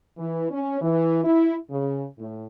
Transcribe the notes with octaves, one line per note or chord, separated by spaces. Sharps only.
E3
C#4
E3
E4
C#3
A2